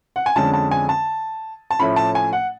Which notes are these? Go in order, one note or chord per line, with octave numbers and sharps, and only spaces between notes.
F#5
G#5
F2 D3 G#3 C#4 A5
A5
G#5
A5
A5
A2 F3 A3 C#4 B5
A5
G#5
F#5